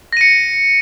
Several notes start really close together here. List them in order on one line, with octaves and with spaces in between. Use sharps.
A#6 D#7 C#7